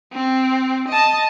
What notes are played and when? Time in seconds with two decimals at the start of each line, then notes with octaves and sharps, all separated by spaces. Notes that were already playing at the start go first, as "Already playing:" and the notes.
0.12 C4
0.89 D#5 A5